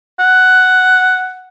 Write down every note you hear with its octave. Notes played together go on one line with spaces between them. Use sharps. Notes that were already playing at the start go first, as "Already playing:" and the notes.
F#5